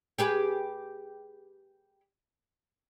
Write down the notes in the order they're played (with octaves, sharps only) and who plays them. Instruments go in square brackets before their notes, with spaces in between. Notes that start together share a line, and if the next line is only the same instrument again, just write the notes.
[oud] G4 G#4 B4